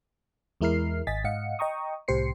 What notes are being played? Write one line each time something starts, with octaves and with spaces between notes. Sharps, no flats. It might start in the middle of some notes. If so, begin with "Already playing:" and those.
E2 G#3 E4 A#4 F6 C7
G#1 D#5 G#5 A6 B6
G#2 D#5 F5 F#5 C#7
D#5 G5 A#5 C#6 D#6
C2 A2 G4 C5 C7 C#7